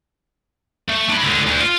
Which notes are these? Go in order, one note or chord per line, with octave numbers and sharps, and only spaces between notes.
A3
D4 B5
C#2 D3
D2
F4